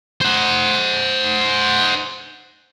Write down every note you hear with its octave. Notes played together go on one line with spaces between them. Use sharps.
C5 F#5